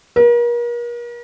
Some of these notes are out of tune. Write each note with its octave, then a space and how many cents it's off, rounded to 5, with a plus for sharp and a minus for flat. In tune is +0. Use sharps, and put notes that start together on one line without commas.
A#4 +40